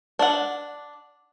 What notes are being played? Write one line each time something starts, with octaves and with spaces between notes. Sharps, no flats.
D4 F#5